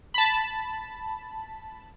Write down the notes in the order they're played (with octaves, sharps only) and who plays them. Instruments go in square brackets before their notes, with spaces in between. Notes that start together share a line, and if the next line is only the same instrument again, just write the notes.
[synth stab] A5 B5